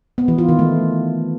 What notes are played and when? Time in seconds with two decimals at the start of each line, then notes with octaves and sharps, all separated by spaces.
0.18 B3
0.28 E3
0.38 F4
0.49 D#3
0.59 A3